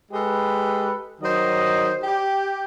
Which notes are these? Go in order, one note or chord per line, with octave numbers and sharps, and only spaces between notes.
G#3 G4 A4 B4
D#3 F#3 C5 D#5
G4